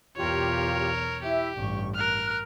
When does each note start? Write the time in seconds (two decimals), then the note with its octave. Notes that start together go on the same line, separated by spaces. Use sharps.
0.17 B1 E2 F4 G4 A#4 C#5
1.23 E4 G4 E5
1.56 A1 G2 C#6
1.95 A#4 F6 F#6